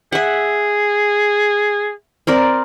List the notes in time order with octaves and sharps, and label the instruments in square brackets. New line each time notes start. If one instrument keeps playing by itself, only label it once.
[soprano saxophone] G#4 [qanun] E5 F#5
[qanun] C4 A#4 D5